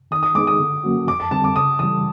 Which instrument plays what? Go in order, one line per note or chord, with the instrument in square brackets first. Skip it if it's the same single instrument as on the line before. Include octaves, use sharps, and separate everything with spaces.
[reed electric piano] D#3 [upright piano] D#6
[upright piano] D#6
[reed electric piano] G#3 B3 D#4 G#4 [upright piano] D6
[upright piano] D#6
[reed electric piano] D3
F#3 A#3 C#4 F#4
[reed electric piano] F2 [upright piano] D6
[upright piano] A5
[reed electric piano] D3 G3 C4 [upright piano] A5
[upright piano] D6
[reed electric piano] C#3 [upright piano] D#6
[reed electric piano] E3 G3 [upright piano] D#6